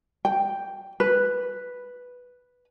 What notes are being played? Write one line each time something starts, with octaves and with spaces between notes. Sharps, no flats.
G5
B4